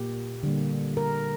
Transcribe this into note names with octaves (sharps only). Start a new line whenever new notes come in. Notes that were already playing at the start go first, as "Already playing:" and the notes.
Already playing: A#2 A#3 G4
D3 G3 A#3
A#4